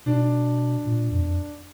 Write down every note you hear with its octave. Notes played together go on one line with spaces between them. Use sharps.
B2 D4
A#2
F2
E2
F2